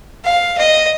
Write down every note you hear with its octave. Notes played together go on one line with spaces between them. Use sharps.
F5
D#5